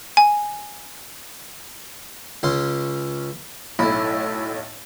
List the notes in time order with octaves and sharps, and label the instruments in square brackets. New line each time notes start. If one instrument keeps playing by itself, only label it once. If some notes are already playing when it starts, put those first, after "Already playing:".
[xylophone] G#5
[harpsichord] C#2 C#4 C6
[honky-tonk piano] B1 A2 [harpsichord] E4